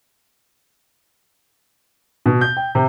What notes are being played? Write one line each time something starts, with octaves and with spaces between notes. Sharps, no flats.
B2
G6
G5
C3